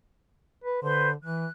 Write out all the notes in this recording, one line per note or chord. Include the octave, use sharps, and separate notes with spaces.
B4
D3 B4 C5 C6
E3 F#6